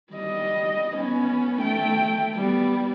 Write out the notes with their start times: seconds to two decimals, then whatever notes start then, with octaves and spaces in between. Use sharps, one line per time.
0.13 G3 D#5
0.97 B3 C#4
1.61 A3 G5
2.35 G3 B3